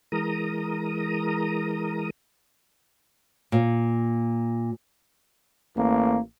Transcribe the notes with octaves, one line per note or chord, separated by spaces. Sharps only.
E3 G#3 A#4 A#5 D#6
A#2
A1 A#3